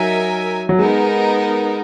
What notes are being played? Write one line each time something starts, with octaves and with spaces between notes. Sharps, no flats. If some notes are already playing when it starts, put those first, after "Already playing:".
Already playing: F#3 D#4 A#4 E5 G#5
F#3
G#3 B3 D#4 A#4